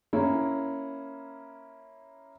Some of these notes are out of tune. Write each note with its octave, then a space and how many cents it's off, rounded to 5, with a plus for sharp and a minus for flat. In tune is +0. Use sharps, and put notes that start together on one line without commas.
A#3 +0 C#4 +0 E4 +0